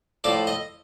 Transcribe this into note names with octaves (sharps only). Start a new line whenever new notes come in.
A2 F3 D5
D#5